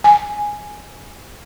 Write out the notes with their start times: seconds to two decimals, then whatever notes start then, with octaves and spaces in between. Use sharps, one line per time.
0.04 G#5